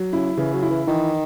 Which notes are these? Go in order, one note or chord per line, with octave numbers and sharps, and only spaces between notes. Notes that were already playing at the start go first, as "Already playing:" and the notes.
Already playing: F#3
C#3 E4
C#3 E3
F#3
E4
E3
D#3 E3